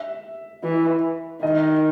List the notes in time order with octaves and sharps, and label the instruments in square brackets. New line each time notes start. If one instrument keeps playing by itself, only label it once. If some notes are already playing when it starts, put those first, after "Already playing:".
Already playing: [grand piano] E5
[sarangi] E3
[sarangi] D#3 [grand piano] D#5